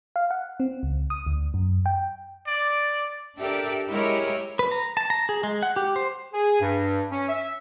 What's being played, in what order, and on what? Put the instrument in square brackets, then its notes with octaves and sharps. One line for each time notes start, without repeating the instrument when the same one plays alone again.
[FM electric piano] F5
F#5
C4
C#2
D#6
D2
F#2
G5
[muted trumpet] D5
[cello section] D4 G4 A4 A#4 D5 E5
G#3 E4 G4 A#4 C#5 D#5
[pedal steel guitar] B4
A#5
A5
A#5
G#4
G#3
F#5
G4
C5
[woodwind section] G#4
G2
C#4
E5